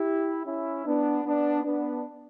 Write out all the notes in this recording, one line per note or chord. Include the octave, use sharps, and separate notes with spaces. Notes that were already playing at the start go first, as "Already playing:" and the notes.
Already playing: E4 G4
C#4 E4
B3 D4
B3 D4
B3 D4